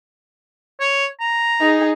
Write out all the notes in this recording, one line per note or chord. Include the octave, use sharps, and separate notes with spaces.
C#5
A#5
D#4 G#4